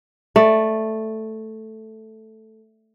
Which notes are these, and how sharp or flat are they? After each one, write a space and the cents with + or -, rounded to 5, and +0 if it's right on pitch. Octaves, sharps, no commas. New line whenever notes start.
A3 +0 D5 +15